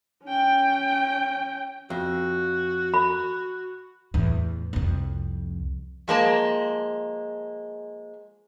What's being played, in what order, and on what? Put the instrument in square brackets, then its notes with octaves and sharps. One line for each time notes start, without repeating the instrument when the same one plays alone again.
[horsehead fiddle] C#4 G5
[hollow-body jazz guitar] F2 [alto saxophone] F#4
[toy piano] B5
[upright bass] E2 A2
C2 F2
[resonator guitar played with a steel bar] F3 G#3 A#3 A5